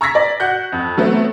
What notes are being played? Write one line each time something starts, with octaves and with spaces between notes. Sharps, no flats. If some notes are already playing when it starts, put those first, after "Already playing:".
A#5 C#6 E6 G#6 A#6 B6
D5
F#4 F#5 F#6 G6
F2
F#3 A3 B3 C4